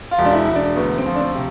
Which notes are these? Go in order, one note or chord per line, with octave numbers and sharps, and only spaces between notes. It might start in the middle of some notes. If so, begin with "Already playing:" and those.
F4
E1
D4
E4
E1 E4
D4
D2 B3
C4
F3
D4
C4
C3